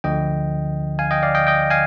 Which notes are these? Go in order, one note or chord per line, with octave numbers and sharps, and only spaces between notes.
D2 D3 F3 D#5 G5
F5 G#5
D#5 G5
D5 F5
D#5 G5
D#5 G5
F5 G#5